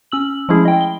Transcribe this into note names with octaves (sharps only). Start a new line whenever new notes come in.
C#4 E6 F#7
F3 G#3 A3 C#4 E4 G#4
D#5 G5
G7